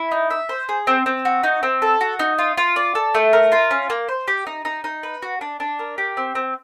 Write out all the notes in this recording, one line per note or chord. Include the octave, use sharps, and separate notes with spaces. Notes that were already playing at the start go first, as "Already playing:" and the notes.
Already playing: E4
D#4
E5
C5
G#4
C4
C4
F#4
D#4
C4
A4
F#4
D#4
F4
F4
D5
A4
A3
A#4
F4
C#4
A#3
C5
G4
D#4
D#4
D#4
B4
F#4
D4
D4
A#4
G4
C4
C4